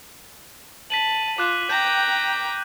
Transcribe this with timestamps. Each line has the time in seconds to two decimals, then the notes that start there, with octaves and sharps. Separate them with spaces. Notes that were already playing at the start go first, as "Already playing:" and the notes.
0.90 A5 B6 D#7 F#7
1.38 F4 D6 F#6 E7
1.69 G5 A#5 G6